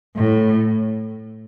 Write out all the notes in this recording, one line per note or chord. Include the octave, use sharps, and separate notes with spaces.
A2